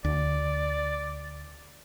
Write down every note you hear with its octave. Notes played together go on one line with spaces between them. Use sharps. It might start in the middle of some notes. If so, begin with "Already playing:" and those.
D2 D5